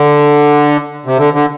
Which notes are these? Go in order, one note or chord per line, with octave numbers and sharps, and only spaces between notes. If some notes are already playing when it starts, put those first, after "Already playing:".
Already playing: D3
C3
D3
D3